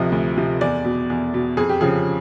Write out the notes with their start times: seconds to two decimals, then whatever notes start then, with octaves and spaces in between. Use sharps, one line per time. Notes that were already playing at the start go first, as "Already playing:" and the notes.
Already playing: D2 C3 F3 D#5
0.12 D2
0.37 C3 F3
0.61 E2 D5
0.85 B2
1.10 E2
1.34 B2
1.57 F2 G#4
1.69 G4
1.81 C#3 F3 G#4